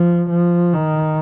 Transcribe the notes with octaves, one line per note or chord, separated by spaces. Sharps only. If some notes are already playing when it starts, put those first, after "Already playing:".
Already playing: F3
F3
D#3